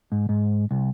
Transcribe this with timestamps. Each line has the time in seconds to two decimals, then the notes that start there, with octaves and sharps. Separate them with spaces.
0.12 G#2
0.29 G#2
0.71 C2